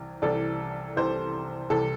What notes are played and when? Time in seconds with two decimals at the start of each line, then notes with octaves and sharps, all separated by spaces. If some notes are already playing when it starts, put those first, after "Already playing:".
Already playing: C2 C3 E3
0.22 C2 C3 E3 A4 D5
0.96 C2 C3 E3 C5
1.70 C2 C3 E3 A4